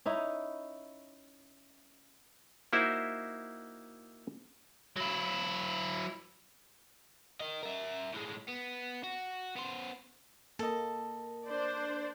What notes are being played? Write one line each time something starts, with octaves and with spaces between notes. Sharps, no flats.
C#4 D#4 E4
A#3 D#4 E4 F#4 C5 E5
F#3 E4
A#4 D#5
A#4 E5
A2 G#3
B3
F#4
B3 C5
A#3 A4 D#5
D4 C5 D5